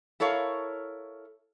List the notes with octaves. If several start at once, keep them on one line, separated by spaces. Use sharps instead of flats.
E4 A4 A#4 C#5 F5